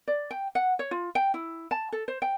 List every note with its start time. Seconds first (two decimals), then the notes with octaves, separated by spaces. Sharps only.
0.08 D5
0.31 G5
0.55 F#5
0.79 C#5
0.91 F4
1.15 G5
1.34 E4
1.71 A5
1.92 A4
2.08 C5
2.22 G5